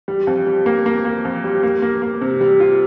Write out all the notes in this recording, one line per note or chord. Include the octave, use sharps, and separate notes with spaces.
G3
F2
G3
A#3
A#3
A#3
F2
G3
A#3
A#3
A#3
C3
G3
F4